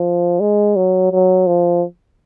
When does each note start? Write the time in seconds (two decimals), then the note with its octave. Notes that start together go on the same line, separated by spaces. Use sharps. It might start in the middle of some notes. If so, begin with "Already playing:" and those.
Already playing: F3
0.40 G#3
0.76 F#3
1.12 F#3
1.47 F3